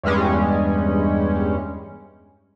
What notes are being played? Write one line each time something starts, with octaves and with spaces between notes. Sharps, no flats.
E2 G2 G3 G#3 C#4